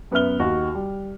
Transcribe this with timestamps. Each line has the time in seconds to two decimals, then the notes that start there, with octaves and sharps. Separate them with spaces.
0.11 F#2 B3 B4 E5 F6 G7
0.39 D#2 F#4 D#5
0.75 G3